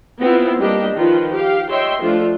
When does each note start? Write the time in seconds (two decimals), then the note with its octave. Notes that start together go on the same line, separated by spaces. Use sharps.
0.20 B3 C4 E4 F4
0.60 G3 A#3 D4 G4 D#5
0.95 D#3 F3 F4 B4
1.33 G4 F5
1.70 C#5 D#5 E5 G5 C6
2.01 F3 A3 D4 F4